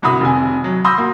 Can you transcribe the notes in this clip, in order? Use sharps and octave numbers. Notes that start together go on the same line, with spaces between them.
G1 C2 F#4 B5 D#6
F1 C3 G#5
F#3
B5 C6 D#6 E6 G6 A#6
A#3 F#4